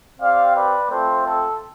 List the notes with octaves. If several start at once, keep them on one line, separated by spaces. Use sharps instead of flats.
C4 G4 D5 F5
B4 D5
A3 C4 F4 A4 C5
A4